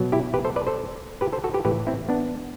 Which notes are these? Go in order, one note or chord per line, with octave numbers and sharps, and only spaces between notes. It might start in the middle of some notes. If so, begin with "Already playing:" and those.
Already playing: B2 F#3
E4 G4
G4 B4
A4 C5
B4 D5
A4 C5
G4 B4
A4 C5
F#4 A4
G4 B4
A2 E3 G4 B4
C4 E4
B3 D4